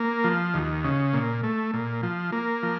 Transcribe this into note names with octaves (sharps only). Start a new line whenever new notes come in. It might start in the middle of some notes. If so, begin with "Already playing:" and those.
Already playing: A#3
F3
D#2
C#3
A#2
A3
A#2
F3
A#3
F3